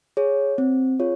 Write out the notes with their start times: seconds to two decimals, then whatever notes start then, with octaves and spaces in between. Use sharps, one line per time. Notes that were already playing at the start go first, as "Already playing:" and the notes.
0.17 G#4 C#5
0.58 C4
1.00 F4 G#4 C#5